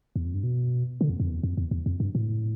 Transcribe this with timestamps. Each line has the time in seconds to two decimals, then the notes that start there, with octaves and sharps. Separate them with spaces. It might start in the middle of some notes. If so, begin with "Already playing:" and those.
0.16 E2
0.25 F2
0.34 G2
0.44 B2
1.01 D3
1.10 F2
1.20 F2
1.29 E2
1.43 F2
1.57 E2
1.71 E2
1.86 F2
2.00 G2
2.15 A2